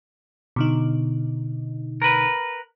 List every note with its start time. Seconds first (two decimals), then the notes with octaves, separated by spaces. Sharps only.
0.56 B2 D3 D#4
2.02 A#4 B4